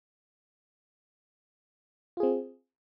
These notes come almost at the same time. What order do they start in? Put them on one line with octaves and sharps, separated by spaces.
F4 G#4 C4